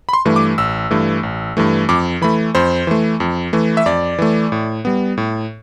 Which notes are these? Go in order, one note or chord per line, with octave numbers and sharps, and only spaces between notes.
B5
C6
G2 E3 A3
D6
A1 E6
G2 E3 A3
A1
G2 E3 A3
F2 D6
E3 A3 B5
F2 C5
E3 A3
F2
E3 A3
E5
F2 D5
E3 A3
A2
G3 B3
A2